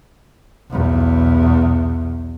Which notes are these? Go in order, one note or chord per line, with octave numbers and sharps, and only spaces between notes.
B1 E2